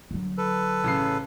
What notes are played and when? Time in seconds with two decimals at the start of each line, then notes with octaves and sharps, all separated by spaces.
0.11 D3 F#3
0.37 A4 B4
0.84 A1 C#3 C7